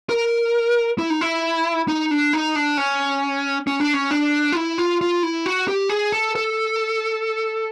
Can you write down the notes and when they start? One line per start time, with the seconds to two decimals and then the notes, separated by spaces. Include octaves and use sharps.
0.09 A#4
0.98 E4
1.10 D#4
1.21 E4
1.88 D#4
2.11 D4
2.33 D#4
2.56 D4
2.77 C#4
3.67 C#4
3.80 D4
3.94 C#4
4.11 D4
4.52 F4
4.55 E4
4.78 F4
5.01 F4
5.23 E4
5.46 F#4
5.68 G4
5.90 G#4
6.12 A4
6.35 A4